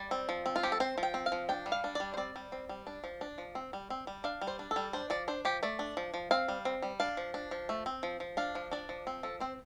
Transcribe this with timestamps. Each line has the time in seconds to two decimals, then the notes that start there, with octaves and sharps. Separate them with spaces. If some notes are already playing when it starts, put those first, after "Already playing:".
Already playing: G3 D5
0.11 C4
0.29 F3
0.46 C4
0.56 F4
0.63 F3 G4
0.72 A4
0.80 C4 C5
0.98 F3
1.03 G5
1.14 C4
1.26 F5
1.32 F3
1.49 D4 G5
1.66 G3
1.72 F5
1.84 D4
1.95 G3 D5
2.14 C5
2.17 C4 D5
2.36 G3
2.52 C4
2.69 G3
2.87 D4
3.04 F3
3.21 D4
3.38 F3
3.55 C4
3.73 G3
3.90 C4
4.07 G3
4.24 D4 F5
4.41 G3
4.47 C5
4.59 D4
4.71 A4
4.76 G3
4.93 D4 C5
5.10 F3 D5
5.28 D4 C5
5.45 F3 G4
5.63 A3 D5
5.79 D4
5.97 F3
6.14 F3
6.31 C4 F5
6.48 G3
6.65 C4
6.82 G3
7.00 D4 F5
7.17 F3
7.34 D4
7.51 F3
7.69 A3
7.86 C4
8.03 F3
8.20 F3
8.37 D4 F5
8.55 F3
8.71 D4 D5
8.89 F3
9.07 C4
9.23 F3 A4
9.40 C4 C5